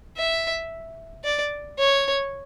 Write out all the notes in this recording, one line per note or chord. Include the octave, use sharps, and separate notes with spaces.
E5
D5
C#5